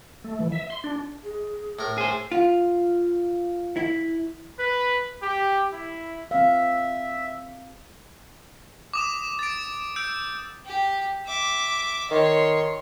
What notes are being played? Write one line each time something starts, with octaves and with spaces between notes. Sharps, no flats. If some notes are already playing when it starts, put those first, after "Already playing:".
A3
E3
E5
C6
D4
G#4
A2 A#4
G#4 C5
F4
E4
B4
G4
E4
C4 E5 F5
D6 D#6 E7
A6 D7
E6 G6 D7
G4
E5 D6
D#3 C#5 C6